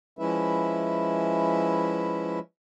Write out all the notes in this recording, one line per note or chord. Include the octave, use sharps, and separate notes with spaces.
F3 G#3 C#4 E4 B4 E5